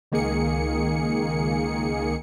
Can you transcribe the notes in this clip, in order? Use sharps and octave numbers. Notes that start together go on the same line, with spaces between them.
C#2 D#3 A#3 G#4 C#7